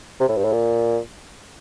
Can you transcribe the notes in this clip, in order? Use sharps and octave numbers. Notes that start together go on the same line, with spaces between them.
C3
A2
G2
A2
A#2